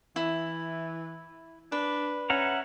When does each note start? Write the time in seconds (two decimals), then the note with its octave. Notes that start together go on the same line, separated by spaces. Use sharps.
0.16 E3 E4
1.72 D4 B4
2.30 C#4 E5 F#5 A#5